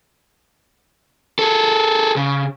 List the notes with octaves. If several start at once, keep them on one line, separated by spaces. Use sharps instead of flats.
G#4 A4
C#3